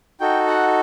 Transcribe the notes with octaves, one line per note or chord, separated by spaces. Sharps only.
D#4 F#4 A4 G5
F#5